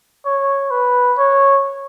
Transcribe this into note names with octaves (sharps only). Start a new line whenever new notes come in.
C#5
B4
C#5